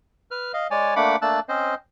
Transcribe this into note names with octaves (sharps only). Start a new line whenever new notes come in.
B4 F6
D#5 F5
G#3 C#5 D5 G#5
A3 A#3 D4 F#5 B5 D6
A3 A#3 D4 A5 E6 F#6
C4 C#4 C5 D#5